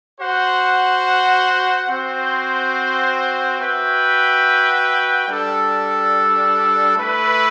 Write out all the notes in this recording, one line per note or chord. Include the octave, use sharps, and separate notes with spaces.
F#4 C5 F#5
C4 F#4 C5
F#4 B4 E5 G5
G3 D4 A4
A3 E4 B4